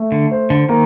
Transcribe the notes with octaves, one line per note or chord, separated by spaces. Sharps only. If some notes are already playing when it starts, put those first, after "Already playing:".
Already playing: A3
D3
C5
D3
D#3 A#3